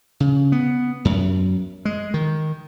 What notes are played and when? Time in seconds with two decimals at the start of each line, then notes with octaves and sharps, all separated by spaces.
0.20 C#3
0.52 B3
1.05 F#2
1.85 G#3
2.14 D#3